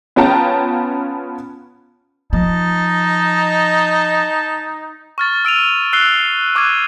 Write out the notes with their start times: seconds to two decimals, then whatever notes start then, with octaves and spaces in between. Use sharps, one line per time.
0.16 B3 C#4 F4 G5 A5 A#5
2.33 F3 D#4 D#5 A5
5.18 C#6 F6 A6
5.45 E6 D7 D#7 F7
5.93 E6 F#6 C7 G7
6.55 C#6 D6 F6 F#6 G#6 D#7